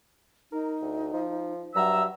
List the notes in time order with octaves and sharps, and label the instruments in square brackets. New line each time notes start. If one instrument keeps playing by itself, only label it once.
[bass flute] D#4 [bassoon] A#4
[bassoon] D2
F3
[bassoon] G2 [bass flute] F#3 [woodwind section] E5 A#5 E6